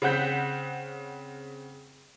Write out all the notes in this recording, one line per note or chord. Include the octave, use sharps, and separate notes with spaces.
C#3 C4 F#5 G6 B6